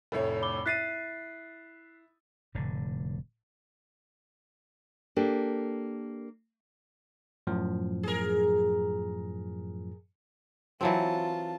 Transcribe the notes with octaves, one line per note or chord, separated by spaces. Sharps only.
F1 A2 A4 C#5 E5
B5 D6 G7
E4 F#6 A6 B6 C7 D#7
F1 A2 D3
A#3 D4 G4 A4
F#2 A2 F3
G#4 A#4
E3 F#3 C4 F4 A5